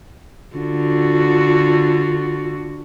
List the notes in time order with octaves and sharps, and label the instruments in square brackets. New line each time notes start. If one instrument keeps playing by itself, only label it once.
[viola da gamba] D3 F4 F#4